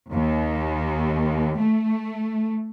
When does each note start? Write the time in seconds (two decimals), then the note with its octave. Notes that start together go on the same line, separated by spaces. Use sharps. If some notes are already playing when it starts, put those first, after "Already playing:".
0.11 D#2
1.60 A3